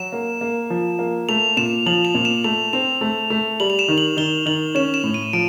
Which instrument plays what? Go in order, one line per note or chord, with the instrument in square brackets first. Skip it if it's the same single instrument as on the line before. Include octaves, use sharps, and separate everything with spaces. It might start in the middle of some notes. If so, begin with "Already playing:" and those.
Already playing: [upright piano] F#3 [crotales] E7
[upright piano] A#3
A#3
F3
A#3
[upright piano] A3 [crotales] F7
[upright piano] A#2 [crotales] E7
[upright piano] F3 [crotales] F#7
[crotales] F7
[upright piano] A#2
[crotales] E7
[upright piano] A3 [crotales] F7
[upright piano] C4 [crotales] F7
[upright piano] A3
A3
[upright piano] G3 [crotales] F#7
[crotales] F7
E7
[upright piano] D#3
[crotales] F#7
[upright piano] D#3 [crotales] G7
[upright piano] D#3 [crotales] F#7
[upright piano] C#4 [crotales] E7
[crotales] E7
[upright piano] A2
[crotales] D#7
[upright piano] F3 [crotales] D7